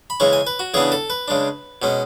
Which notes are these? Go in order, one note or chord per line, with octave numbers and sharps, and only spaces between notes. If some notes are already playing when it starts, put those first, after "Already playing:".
B5
C#3 E3 G#3 C#4 C#6
G#5
B4
F#4
C#3 E3 B3 D4 G#4
A4
B4
C#3 G#3 D4
B2 G#3 C#4